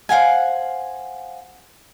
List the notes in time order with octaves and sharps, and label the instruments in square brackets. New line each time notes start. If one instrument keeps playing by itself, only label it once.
[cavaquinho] C5 F5 F#5 G#5